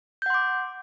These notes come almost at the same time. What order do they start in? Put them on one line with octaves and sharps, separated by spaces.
G6 F#5 C6 D6